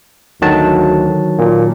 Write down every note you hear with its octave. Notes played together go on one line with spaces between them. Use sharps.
D2 D#3 F#3 A5
A#2